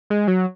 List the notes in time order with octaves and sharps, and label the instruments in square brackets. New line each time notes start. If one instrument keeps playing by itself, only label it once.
[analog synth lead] G#3
F#3